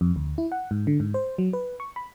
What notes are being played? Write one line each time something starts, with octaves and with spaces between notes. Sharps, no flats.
F2
D2
E4
F#5
G#2
D3
G#2
C5
F#3
B4
C#6
B5